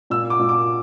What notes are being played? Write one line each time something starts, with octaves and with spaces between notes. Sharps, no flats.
A#2 E6
D6
A#2
D6